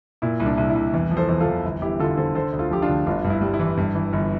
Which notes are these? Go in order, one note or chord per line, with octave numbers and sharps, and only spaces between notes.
A#2 E4
C2
D4
C2
E4
C2
E2
F3
A4 C5
E2
F4 A4
E2
G1
G1 E4 G4
D3 F4 A4
D3 A4 C5
D3 A4 C5
D2
F4 A4
F3 G4
D4 F4
D2
G1 D4 F4
G2
E4
G3
E4
E3
G2
E3
G1